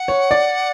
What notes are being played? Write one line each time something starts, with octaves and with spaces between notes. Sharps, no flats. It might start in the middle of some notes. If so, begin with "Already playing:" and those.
Already playing: F#5
C#5
D5